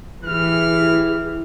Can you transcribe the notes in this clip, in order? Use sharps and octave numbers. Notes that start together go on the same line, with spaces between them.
E3 E4 G4 G#4 F6